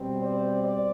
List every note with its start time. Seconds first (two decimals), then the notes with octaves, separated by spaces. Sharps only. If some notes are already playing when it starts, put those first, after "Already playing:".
Already playing: B2 G3 C4
0.21 C5 D5
0.63 C5 D5